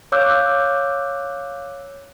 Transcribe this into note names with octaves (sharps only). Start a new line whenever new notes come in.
C#5 F5 D6 E6 F#6 G6